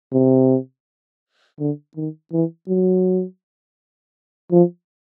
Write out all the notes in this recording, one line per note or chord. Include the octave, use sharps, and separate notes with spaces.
C3
D3
D#3
E3
F#3
F3